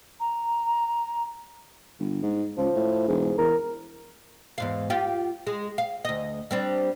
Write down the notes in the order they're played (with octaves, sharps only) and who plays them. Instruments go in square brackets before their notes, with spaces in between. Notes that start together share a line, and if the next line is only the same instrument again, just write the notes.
[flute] A#5
[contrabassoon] G1
G#2
[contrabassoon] C#2 [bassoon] F3
[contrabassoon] A2
[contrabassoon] E1 [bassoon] G#2
[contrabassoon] E2 [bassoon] A#4
[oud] E2 G#2 F5
F4 G4
G#3
F5
D2 D#5
G3 C4 D4